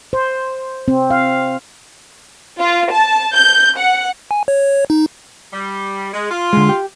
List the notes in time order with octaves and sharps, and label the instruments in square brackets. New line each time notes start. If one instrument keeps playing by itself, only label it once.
[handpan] C5
C4
F5
[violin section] F4
A5
G6
F#5
[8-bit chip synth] G#5
C#5
D#4
[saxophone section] G3
G#3
F4
[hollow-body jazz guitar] D3 G#3
G4